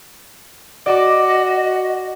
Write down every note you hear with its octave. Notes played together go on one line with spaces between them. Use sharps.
F#4 D5 D#5 D6